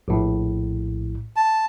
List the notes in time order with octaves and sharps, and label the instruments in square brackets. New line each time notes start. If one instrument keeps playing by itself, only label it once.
[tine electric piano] A#1 A2
[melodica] A5